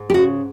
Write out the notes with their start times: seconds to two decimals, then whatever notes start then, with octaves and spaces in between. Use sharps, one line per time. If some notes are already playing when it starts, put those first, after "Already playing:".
Already playing: G#2
0.10 G4
0.14 C#3 F#4